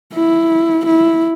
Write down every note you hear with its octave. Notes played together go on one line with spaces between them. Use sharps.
E4
E4